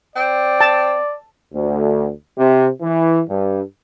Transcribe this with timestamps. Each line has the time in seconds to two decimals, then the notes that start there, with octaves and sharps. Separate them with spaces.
0.16 C4 D5
0.61 A5
1.54 D2
2.37 C3
2.82 E3
3.28 G2